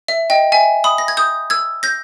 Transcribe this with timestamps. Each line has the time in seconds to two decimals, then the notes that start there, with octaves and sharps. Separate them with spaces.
0.08 E5
0.30 D#5 G5
0.52 E5 G#5
0.84 B5 D#6
0.98 A#6
1.08 G#6
1.17 D#6 G6
1.50 E6 G#6
1.83 G6 A#6